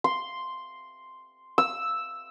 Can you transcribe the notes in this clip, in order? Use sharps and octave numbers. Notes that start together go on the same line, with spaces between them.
C6
E6